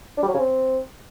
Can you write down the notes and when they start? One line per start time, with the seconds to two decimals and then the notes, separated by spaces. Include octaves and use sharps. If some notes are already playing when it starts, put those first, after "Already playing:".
0.17 D4
0.23 G3
0.28 F#3
0.34 C#3
0.39 C4